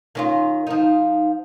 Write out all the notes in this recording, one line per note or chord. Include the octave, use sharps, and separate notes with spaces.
D#3 C#4 F4
F3 D#4